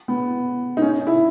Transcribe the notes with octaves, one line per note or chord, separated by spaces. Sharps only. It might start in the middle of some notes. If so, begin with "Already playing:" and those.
B3
D#4
C#4
E4